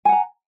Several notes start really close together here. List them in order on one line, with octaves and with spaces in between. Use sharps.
G#5 F#5 A#5